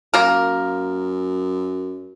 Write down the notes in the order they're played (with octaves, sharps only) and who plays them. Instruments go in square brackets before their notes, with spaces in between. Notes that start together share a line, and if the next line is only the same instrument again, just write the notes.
[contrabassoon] F#2 [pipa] A#3 A#4